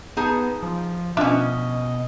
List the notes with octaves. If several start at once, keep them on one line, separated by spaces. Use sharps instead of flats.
B3 D#4 G#4 A5
F3
B2 F3 C#4 D4 F4 D#5 E5